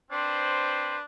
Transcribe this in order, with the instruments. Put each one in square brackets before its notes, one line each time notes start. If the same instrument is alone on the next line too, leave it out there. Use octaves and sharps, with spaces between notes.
[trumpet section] C4 B4 C5 [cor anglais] D4